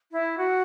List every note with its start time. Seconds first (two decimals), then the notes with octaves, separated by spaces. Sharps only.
0.12 E4
0.38 F#4